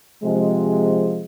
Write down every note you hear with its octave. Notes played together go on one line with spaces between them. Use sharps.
C3 F3 G#3